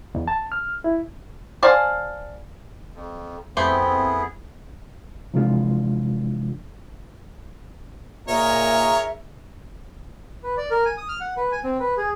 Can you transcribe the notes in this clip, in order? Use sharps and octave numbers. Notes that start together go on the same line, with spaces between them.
E2
A5
F6
E4
C5 D5 F5 G#5 A5
F2
F2 A3 B3 C4 E4 G4 G#4 C5
C3 E3 F3 G#3 D4 F4
A#2 D#4 G#4 A#4 C#5 E5
B4
D5
A#4
G#5
D#6
F6
F#5
B4
G#5
C4
B4
G#4